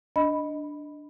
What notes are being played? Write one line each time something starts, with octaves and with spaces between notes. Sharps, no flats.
D4 D#5 B5